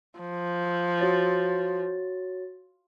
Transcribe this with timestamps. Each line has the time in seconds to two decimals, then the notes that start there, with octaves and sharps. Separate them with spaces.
0.20 F3
0.99 F#4 C#5 A6